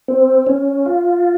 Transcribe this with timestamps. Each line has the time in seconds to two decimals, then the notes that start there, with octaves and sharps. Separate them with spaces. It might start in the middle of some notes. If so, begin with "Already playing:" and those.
0.08 C4
0.47 C#4
0.86 F4